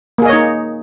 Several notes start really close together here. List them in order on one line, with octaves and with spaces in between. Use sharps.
A#3 G#4 D#5 C#5 D#4